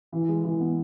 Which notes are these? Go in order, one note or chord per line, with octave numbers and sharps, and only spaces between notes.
E3
G#3
E3
B3